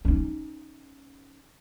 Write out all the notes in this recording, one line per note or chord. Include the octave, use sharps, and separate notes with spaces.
C#4 D#4